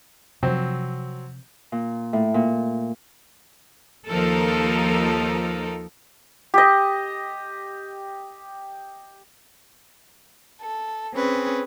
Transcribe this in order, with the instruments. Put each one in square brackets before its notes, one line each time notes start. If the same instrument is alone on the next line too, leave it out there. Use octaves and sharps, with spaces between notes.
[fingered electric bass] C3 F3 [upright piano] F#3 C4
[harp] A#2
A2
A#2
[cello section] D#2 F3 D#4 A4 A#4
[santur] G4 D#5
[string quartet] A4
C4 C#4 G#4 B4